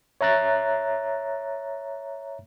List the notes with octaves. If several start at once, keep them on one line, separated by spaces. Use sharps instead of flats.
C#5 E5 A#5 F#6 A6